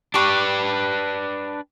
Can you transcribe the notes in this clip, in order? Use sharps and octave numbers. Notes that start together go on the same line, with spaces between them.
D4 G4 B4 C#6